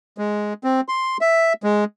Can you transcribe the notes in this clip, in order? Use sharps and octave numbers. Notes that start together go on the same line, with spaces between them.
G#3
C4
C6
E5
G#3